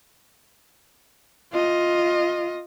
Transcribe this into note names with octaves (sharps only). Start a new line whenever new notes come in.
F4 D#5